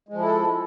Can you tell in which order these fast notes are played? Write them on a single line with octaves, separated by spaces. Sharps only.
G#3 F3 E4 A4